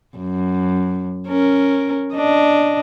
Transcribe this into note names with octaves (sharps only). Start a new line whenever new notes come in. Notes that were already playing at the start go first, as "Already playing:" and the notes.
F#2
C#4 A#4
D4 D#5